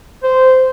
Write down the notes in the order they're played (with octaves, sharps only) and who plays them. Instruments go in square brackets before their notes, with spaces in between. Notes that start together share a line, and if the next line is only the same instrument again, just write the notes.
[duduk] C5